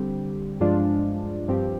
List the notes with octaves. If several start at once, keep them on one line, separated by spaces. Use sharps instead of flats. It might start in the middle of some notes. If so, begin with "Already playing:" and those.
Already playing: D3 G3 C4 G4
G2 F3 G#3 D4 F4
G2 F3 C4 G4